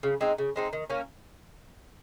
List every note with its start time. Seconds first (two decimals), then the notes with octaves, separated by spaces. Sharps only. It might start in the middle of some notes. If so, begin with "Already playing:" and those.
0.03 C#3
0.21 G#3 C4 D#4
0.38 C#3
0.56 G#3 C4 D#4
0.73 D#3
0.90 A#3 C#4